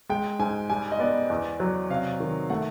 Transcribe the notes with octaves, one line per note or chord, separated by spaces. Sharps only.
G#3 G5
G#2 G#5
G3 G#5
D#5
B3 D5
E2
F#3
C3 F5
D#3
A3 F#5